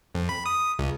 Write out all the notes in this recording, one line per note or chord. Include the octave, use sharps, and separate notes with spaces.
F2
B5
D#6
C#2